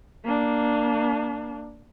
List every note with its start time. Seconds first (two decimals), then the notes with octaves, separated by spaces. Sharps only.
0.24 A#3 D4